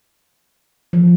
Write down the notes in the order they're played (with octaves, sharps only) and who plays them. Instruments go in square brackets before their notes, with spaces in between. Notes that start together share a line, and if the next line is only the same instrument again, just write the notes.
[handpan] F3